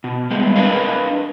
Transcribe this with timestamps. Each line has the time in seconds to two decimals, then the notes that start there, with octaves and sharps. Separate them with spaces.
0.04 B2
0.30 G3 G#3 B3
0.56 D4 A#4 B4 D#5 F5